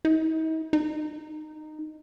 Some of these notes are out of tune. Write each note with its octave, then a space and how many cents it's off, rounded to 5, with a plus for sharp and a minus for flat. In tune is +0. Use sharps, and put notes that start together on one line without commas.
D#4 +45
D#4 -15